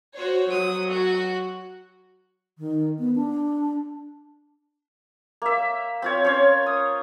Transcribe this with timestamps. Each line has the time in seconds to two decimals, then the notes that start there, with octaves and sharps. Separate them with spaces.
0.16 F#4 C5 C#5
0.51 F#3 D#6
0.90 F#4
2.58 D#3
2.99 B3
3.16 D4
5.42 A#3 E5
6.02 C4 F4 C#5
6.25 C#4 C5 C#5
6.66 D#6